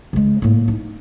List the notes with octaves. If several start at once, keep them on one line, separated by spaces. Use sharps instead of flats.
C#3 G#3
A2 A#3
D#4